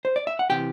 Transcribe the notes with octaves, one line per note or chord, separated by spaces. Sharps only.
C5
D5
E5
F#5
C3 E3 G4 G5